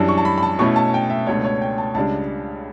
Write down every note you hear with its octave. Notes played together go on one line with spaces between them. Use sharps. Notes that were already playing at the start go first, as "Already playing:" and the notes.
Already playing: F#2 E3 G3 D4 A5
C#6
A5
B5
B5
A5
B2 A3 C#4 E4 C#6
A5
G5
E5
C#2 B2 A3 D4 C#5
C#5
G5
A5
C#2 C#3 G3 D4 A5